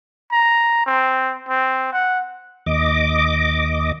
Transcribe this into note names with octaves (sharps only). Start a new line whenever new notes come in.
A#5
C4
C4
F#5
D#2 D#5 D6